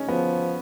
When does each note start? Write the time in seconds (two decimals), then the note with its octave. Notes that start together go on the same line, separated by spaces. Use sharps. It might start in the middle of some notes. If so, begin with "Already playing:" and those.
Already playing: C#4 D#4
0.08 F3 B3